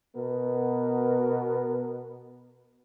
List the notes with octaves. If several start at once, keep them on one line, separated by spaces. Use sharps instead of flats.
B2 B3 A#4